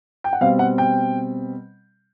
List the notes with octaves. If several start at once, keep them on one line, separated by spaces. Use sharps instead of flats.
G5
F#5
B2 G3 C4 F5
F#5
G5